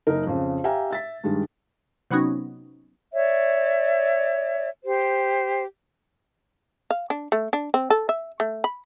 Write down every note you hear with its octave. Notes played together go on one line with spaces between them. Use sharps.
F#1 D#4 A#4
F2 C#3
G4 E5 F5 G5 G#5 A#5
E5 A6 B6
G2 D#3 G3 G#3
C3 F#3 B3 C#4 D#4 F#4
C#5 D5 E5
G4 C5
F5
D4
A3
D4
C4
A4
E5
A3
B5